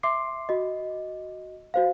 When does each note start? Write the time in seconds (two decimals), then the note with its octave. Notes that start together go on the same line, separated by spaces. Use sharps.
0.03 E5 C6 D6 C7
0.49 F#4 D#5
1.74 F#4 C5 F5